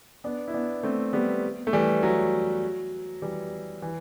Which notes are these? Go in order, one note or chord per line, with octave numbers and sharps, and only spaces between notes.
B3 D4
E4
B3 D4
A3 C4
G3 B3
A3
E3 G3
F#3
E3 G3
E3